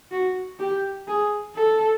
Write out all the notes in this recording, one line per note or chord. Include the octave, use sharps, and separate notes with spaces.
F#4
G4
G#4
A4